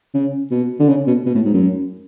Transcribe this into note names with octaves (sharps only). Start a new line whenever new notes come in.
C#3
B2
D3
C#3
B2
B2
A2
G#2
F#2